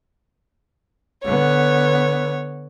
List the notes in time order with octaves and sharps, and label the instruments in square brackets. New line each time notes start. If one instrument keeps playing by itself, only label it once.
[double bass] D3 B3 [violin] C#5